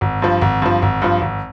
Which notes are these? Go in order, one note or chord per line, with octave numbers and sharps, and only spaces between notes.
G#1
G2 F3
G#1
G2 F3
G#1
G2 F3
G#1